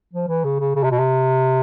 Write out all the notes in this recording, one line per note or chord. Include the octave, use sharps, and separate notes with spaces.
F3
E3
C#3
C#3
C#3
C3
B2
C3